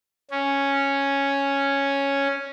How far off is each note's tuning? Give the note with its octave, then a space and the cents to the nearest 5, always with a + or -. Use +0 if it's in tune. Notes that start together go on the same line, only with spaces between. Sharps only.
C#4 +0